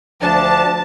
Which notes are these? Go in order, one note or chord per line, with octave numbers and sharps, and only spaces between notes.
D2 F3 D4 A5